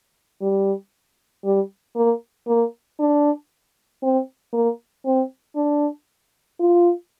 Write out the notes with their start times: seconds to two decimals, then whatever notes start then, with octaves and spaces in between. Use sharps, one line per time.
0.42 G3
1.45 G3
1.96 A#3
2.47 A#3
3.00 D4
4.03 C4
4.53 A#3
5.06 C4
5.56 D4
6.60 F4